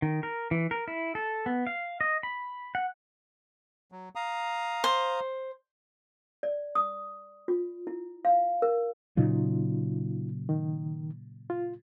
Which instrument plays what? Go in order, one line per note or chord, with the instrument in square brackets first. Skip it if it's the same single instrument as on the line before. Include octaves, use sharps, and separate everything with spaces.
[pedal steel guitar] D#3
A#4
E3
A#4
E4
A4
B3
F5
D#5
B5
F#5
[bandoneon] F#3
F5 A#5 D#6
[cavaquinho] C5
[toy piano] D5
D#6
F4
E4
F5
A#4
[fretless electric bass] A#2 C#3 F#3 [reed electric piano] D#4 F4
[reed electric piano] D#3
F4